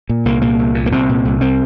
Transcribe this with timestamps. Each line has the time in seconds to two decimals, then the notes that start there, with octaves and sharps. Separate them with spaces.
0.09 A#2
0.25 C2 A#3
0.42 A#2 A#3
0.59 C2
0.75 A#2
0.86 A#3
0.92 C2 C4
1.09 A#2
1.25 C2
1.41 C3 C4